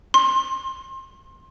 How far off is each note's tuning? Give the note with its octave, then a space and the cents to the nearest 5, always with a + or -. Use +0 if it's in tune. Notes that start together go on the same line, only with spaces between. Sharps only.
C6 +25